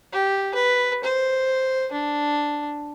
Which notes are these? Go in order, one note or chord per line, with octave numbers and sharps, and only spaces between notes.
G4
B4
C5
D4